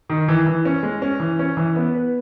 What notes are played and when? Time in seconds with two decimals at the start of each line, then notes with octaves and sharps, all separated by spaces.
0.09 D#3
0.28 E3
0.46 E3
0.65 C#4
0.83 G#3
1.02 C#4
1.20 E3
1.39 C#4
1.57 E3
1.76 B3
1.95 B4